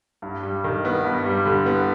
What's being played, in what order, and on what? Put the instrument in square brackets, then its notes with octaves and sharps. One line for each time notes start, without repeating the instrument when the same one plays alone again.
[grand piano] G2
G3
D#3
B3
G2
G3
D3
B3